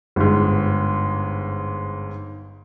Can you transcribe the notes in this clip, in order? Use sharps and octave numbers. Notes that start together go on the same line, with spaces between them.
G1 G#2